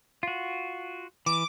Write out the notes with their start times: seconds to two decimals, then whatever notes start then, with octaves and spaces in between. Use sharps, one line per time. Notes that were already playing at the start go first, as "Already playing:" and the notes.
0.23 F4 F#4
1.26 E3 D6